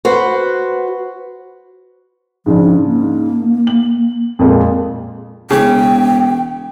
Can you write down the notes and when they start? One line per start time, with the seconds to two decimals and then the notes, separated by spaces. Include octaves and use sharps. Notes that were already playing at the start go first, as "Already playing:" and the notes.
0.05 F#4 B4 C5
2.46 G#2 C#3 F3 D4
2.85 A#3
3.67 F#7
4.39 F2 A#2 G#3
5.51 E1 C#3 G5